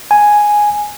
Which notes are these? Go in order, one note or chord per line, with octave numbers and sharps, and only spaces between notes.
G#5